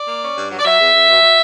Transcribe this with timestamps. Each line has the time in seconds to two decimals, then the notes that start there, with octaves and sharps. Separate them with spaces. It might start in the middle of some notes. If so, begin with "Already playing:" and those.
Already playing: D5
0.08 A#3
0.22 C#4
0.36 G2
0.51 F#3
0.59 D5
0.65 F#3 E5
0.80 E2
0.94 E2
1.09 B2
1.22 F#3